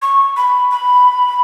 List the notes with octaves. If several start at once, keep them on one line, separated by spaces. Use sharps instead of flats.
C#6
B5
B5